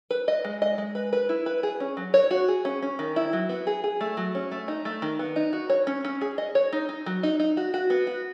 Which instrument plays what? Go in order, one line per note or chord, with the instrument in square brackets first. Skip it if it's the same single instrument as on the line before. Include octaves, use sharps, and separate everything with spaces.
[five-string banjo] B4
D#5
G#3
D#5
G#3
B4
B4
E4
B4
G#4
C#4
F#3
C#5
F#4
G#4
C#4
C#4
D#3
E4
F#3
B3
G#4
G#4
A3
F#3
C#4
A3
D#4
A3
D#3
B3
D#4
F#4
C#5
C#4
C#4
G#4
D#5
C#5
D#4
D#4
F#3
D#4
D#4
F#4
F#4
B3
F#4